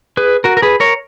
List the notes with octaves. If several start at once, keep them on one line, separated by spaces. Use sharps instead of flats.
G#4 B4
F#4 A#4
A#4
G#4 B4
A#4 C#5